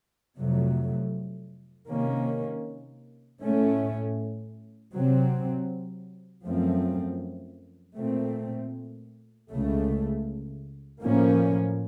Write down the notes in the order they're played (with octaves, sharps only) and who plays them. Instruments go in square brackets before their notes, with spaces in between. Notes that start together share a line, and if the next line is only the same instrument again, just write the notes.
[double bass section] F2 C3 F#3 A3
C3 D#3 A#3 C#4
A2 A3 C#4
C3 F#3 C4
F#2 F3 A3 C4
A#2 A3 C4
C#2 C#3 A3
A2 F3 A#3 C#4